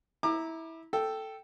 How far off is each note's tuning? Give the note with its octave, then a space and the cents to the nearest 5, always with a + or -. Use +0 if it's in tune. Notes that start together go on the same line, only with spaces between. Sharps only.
E4 -20 A#5 +0 D6 +30
A4 +0 G5 -5